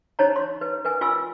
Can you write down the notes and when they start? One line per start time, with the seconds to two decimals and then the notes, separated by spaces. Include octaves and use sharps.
0.19 D#4 C5 C#5 A5 A#5
0.36 C6
0.61 B4
0.85 A#4 B4 G#5
1.01 F4 G#5 C6 E6